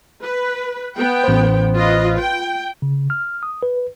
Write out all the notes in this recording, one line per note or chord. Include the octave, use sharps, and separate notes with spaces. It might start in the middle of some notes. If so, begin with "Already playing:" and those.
B4
B3 G5
A1 C5
F4 B4 D#5
G5
C#3
F6
D#6
B4